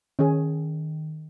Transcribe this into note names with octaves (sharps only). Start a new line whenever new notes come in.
D#3 C#4 G#4